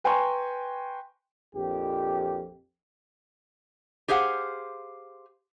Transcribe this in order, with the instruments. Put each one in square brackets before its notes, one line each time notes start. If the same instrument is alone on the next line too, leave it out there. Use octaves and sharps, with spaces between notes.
[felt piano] B4 G5 G#5 A#5 C6 C#6
[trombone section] A#1 F2 G4
[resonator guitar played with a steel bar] G4 G#4 C5 F5 F#5